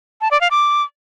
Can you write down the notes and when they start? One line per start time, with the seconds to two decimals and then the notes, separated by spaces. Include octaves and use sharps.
0.21 A5
0.31 D5
0.41 F5
0.51 D6